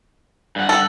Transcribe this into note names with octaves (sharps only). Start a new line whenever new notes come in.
G2 F#5
A4